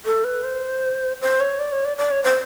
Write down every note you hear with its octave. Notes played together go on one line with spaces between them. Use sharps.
A4
B4
C5
C5
C#5
D5
C#5
D5
D5
C#5
C5